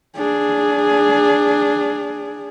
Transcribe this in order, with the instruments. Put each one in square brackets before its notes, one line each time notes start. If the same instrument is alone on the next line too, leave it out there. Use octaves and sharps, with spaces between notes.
[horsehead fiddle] D4 G#4